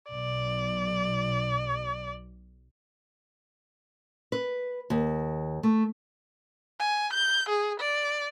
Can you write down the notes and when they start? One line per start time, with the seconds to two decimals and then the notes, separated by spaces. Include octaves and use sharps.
0.11 B1 D5
4.32 B4
4.90 D#2
5.63 A3
6.80 G#5
7.13 G6
7.49 G#4
7.80 D5